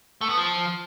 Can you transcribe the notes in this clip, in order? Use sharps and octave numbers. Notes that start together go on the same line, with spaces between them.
A3
B3
F3